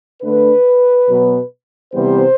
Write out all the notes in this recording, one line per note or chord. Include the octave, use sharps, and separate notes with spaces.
D3 A3 B4
B2 F#3 B3
C3 E3 G3 B3 C5